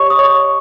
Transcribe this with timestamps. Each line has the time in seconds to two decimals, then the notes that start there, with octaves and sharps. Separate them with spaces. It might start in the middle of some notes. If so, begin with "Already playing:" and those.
Already playing: G4 C#5 D#5 C#6
0.10 D#6
0.19 C#5 C#6